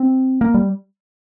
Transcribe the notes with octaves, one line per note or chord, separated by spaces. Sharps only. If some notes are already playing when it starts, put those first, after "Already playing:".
Already playing: C4
A#3
G3